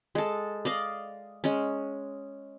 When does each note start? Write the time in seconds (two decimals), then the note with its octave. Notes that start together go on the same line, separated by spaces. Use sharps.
0.15 G#3 A4
0.65 D5 D#5 F5
1.44 G#3 C#4